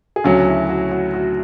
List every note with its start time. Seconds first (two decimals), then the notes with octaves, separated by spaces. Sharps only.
0.16 G#4
0.24 D2 C#3 F#3 C#4 F#4
0.47 E4
0.69 F#4
0.91 F#4
1.14 F#4